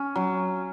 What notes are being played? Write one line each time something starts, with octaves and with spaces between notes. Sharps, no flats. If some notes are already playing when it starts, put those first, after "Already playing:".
Already playing: C#4
F#3